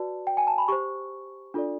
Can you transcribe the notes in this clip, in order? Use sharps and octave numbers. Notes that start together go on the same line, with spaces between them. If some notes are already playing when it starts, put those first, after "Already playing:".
Already playing: F#4 B4 D5 A5
G5
G#5
A5
B5
G4 C5 C#6
D4 F4 A4 D5